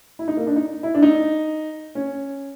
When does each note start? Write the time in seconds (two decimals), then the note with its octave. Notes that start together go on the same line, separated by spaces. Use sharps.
0.19 E4
0.28 D#4
0.37 A#3
0.47 D4
0.56 D#4
0.83 E4
0.95 D4
1.02 D#4
1.95 C#4